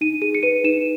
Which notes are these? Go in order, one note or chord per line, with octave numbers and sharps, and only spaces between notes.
D#4 D#7
G#4 D#7
C#7
B4 D#7
D#4 E7